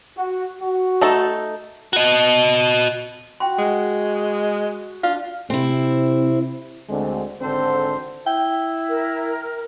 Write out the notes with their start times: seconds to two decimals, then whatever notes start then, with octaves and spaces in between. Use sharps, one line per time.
0.17 F#4
0.61 F#4
1.01 A3 D#4 A4
1.93 F#4 D#5
3.40 F#4 G5 C6
3.59 G#3
5.03 D4 F4 F5
5.50 C3 C4 E4
6.90 D2 D3 G#3 C4
7.41 G#1 D3 C4 D4 A4 C5
8.26 E4 G5
8.89 A#4